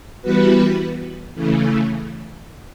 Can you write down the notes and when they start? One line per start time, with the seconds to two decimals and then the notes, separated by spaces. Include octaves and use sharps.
0.22 E3 G3 B3 F#4 B4
1.34 C#3 E3 A3